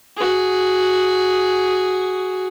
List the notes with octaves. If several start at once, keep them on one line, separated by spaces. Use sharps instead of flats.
F#4 G#4